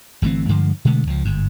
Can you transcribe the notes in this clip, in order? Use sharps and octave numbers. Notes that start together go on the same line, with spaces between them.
G1 E3 A3 C4
G2 D3 F3 G#3
B2 D3 G#3 A3
C#2 F3
G1 G#2